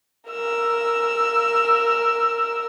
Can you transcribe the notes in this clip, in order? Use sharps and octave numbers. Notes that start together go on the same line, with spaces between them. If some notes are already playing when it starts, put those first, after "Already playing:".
A#4 E6